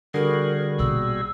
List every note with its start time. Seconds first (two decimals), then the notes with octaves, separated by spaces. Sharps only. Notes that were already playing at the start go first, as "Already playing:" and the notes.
0.14 D3 G3 F#4 G#4 A#4
0.79 A#1 B2 E6